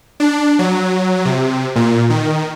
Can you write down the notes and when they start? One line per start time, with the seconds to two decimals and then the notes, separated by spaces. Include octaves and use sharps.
0.20 D4
0.59 F#3
1.25 C3
1.76 A#2
2.10 D#3